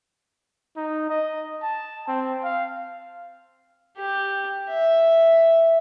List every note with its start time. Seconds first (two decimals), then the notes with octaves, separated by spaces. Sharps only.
0.77 D#4
1.10 D#5
1.63 A5
2.08 C4
2.44 F5
3.98 G4
4.70 E5